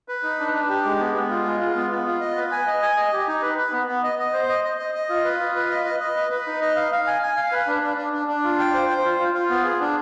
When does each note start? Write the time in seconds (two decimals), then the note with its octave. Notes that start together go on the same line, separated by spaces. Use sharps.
0.08 B4
0.23 D#4
0.39 D4
0.53 D4
0.69 G4
0.85 G#3
0.99 B3
1.14 B3
1.30 F4
1.46 G#3
1.60 F4
1.76 B3
1.90 B3
2.06 F4
2.21 D#5
2.37 B4
2.51 G#5
2.67 D#5
2.82 G#5
2.97 D#5
3.13 G4
3.27 D#4
3.42 B4
3.58 B4
3.72 B3
3.87 B3
4.03 D#5
4.19 D#5
4.33 C5
4.49 D#5
4.64 D#5
4.79 D#5
4.95 D#5
5.09 F4
5.24 B4
5.39 F4
5.55 B4
5.70 D#5
5.85 D#5
6.00 D#5
6.16 B4
6.31 B4
6.47 D#4
6.62 D#5
6.76 F5
6.92 F5
7.07 G#5
7.22 G#5
7.37 F5
7.52 B4
7.67 D4
7.83 D4
7.97 D4
8.13 D4
8.28 D4
8.44 F4
8.59 G5
8.74 C5
8.89 C5
9.05 F4
9.20 F4
9.34 F4
9.49 B3
9.64 G#4
9.81 D4